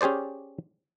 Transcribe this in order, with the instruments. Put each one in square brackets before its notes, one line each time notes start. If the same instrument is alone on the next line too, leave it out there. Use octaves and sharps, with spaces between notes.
[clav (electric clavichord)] C#4 G4 G#4 C5 D5